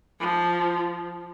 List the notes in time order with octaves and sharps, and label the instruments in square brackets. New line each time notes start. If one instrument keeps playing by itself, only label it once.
[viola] F3